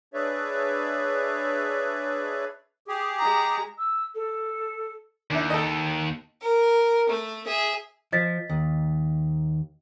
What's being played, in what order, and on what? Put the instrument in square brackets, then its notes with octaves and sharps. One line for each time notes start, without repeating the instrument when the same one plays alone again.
[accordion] D4 G#4 B4 C#5 D5 E5
G4 G#4
[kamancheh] G#3 A#5
[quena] E6
A4
[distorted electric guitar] D#2 [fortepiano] D4 E4
[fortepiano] A4 D#5
[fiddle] A#4
A3
G#4 E5
[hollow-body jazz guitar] F3 [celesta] D#5 A6 B6
[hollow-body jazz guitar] D#2